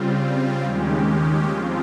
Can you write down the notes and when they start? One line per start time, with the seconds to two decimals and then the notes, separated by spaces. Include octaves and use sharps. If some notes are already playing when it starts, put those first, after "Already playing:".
Already playing: C#3 G3 C4 F4
0.63 D#2 D#3 G#3 C#4 G4
1.50 F3 C4 F4